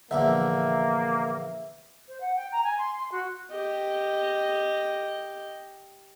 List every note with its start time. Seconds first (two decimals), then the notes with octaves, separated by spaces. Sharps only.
0.11 A#1 E2 D3 A#3 E5
2.08 C5
2.21 F#5
2.36 G5
2.52 A#5
2.64 G#5
2.78 C6
2.96 C6
3.11 F#4
3.51 G4 D#5